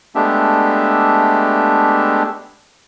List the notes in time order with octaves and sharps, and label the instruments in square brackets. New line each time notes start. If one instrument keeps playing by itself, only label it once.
[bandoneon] G#3 A3 B3 D4 G4 E5